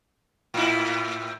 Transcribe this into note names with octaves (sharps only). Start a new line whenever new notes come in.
A2 E4